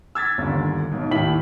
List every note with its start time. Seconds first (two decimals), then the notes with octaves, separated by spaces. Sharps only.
0.15 E6 G#6 A6 B6
0.38 G1 D#2 D3
0.92 B1 G#2
1.11 D#2 A2 E4 B6 F#7